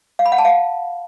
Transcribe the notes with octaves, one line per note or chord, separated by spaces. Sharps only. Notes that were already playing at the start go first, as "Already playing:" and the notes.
F5
B5
F#5
A5
F5